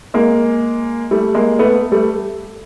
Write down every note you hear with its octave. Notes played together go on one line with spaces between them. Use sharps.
G#3 A#3
G3 A3
G#3 A#3
A3 B3
G3 A3